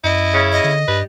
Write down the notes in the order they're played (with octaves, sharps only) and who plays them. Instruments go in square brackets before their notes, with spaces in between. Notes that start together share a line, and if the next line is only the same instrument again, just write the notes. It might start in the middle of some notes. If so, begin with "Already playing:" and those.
[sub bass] F#2 [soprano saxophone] E4 [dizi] D#5
[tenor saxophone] C#3
[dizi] D#5
[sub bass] D3
[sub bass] G2 [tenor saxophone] G3 [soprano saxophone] B4